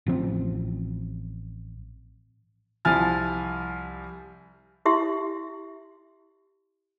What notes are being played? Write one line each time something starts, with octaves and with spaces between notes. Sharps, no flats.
A1 F3 C4
C2 F3 E4 G#5 F6 A6
E4 G4 E5 C6